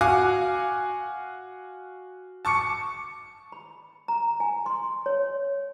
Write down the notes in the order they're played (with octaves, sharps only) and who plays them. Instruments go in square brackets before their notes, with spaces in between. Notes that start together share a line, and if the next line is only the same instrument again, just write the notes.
[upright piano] F#4 F5 G#5 D6
A5 C#6 D6 C#7
[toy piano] B5
A#5
G#5
C6
C#5